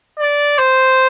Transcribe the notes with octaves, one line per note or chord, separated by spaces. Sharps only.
D5
C5